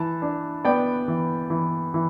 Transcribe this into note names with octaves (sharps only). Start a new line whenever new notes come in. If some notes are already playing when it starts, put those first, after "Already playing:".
Already playing: E3 A5
D4
B3 D5 G5
E3
E3
E3